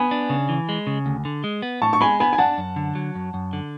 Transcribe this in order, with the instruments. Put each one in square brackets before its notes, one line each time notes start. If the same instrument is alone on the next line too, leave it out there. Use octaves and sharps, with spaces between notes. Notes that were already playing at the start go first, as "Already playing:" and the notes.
Already playing: [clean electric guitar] B3 [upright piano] G#5 B5
[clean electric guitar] D4
C#3
E3
G#3
C#3
D2
D3
G#3
B3
[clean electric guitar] A2 [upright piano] A5 C#6
[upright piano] C#6
[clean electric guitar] G#3 [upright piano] G#5 B5
[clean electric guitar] B3 [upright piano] G#5 B5
[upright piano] G#5
[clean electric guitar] D4 [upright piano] F#5 A5
[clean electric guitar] F#2
D3
F#3
F#2
F#2
D3